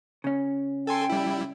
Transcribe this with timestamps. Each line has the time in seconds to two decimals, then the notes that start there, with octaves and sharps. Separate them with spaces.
0.24 C#3 C#4
0.87 A4 G5 G#5 C6
1.10 G3 E4